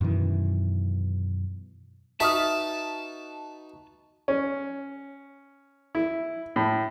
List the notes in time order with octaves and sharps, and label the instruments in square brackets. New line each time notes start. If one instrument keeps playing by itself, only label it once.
[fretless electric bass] F#2 B2 D#3 E3
[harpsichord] D#4 F#4 B4 [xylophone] E5 D#6 F6 [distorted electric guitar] A5
[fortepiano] C#4
E4
A2